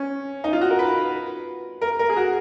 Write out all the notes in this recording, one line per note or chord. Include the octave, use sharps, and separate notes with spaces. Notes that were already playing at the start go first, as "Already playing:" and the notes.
Already playing: C#4
D#4
F4
F#4
A#4
B4
A#4
A#4
G#4
F#4